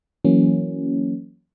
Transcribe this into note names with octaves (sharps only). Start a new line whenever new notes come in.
E3 F#3 A#3 C#4